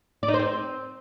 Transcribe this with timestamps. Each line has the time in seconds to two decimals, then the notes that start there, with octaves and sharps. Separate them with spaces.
0.23 D5
0.28 D#4
0.34 C5
0.39 C4